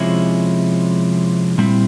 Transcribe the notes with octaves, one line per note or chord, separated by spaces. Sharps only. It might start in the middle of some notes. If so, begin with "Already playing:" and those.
Already playing: C3 F3 G#3 C#4 E4
A#2 G3 C4 E4